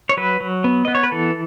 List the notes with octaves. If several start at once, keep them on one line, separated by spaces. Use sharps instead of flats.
C#5
F#3 B4
F#3
B3
B3 D#5
C#5
B4
E3 A4